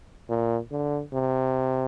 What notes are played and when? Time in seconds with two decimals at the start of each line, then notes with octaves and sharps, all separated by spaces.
0.29 A#2
0.71 D3
1.13 C3